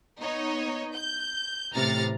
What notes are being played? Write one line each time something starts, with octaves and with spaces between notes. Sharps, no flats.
B3 D#4 C#5
G6
A1 A2 C3 A#5 F6 A6